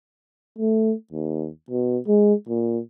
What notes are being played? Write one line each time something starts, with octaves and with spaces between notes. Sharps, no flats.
A3
D#2
B2
G#3
A#2